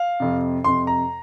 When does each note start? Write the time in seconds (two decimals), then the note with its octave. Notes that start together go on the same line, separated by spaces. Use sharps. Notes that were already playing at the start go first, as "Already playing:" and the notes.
Already playing: F5
0.20 F2 C3
0.64 F2 C3 C6
0.87 A#5